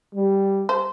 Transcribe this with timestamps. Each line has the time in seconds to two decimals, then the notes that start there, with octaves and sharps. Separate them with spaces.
0.15 G3
0.69 C5